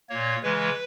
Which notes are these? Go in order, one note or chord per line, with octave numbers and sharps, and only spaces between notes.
A#2 A#3 C#5
C#3 E3 G#3 B4